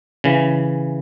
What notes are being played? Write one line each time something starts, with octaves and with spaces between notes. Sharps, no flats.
C#3 E3